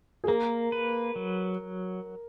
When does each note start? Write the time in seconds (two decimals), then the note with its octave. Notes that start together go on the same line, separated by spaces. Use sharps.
0.24 G#4
0.28 A#3 A#4
0.72 B4
1.16 F#3